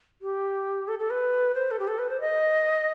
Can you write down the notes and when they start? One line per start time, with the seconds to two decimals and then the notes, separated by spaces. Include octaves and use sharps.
0.22 G4
0.88 A4
0.99 A4
1.10 B4
1.55 C5
1.71 A4
1.79 G4
1.88 A4
1.99 B4
2.09 C5
2.20 D#5